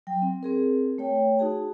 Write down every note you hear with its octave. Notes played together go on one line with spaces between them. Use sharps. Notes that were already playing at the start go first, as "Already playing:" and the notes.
F#3 G5
C4
C4 G#4 A#4
A3 C#5 G5
D#4 F#4 G#4 A5